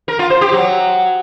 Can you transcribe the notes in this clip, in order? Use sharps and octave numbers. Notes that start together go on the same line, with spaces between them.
A#4
F4
C5
G4
F#3